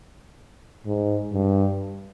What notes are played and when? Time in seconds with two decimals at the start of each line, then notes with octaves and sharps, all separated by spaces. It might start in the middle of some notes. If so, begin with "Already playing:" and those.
0.86 G#2
1.33 G2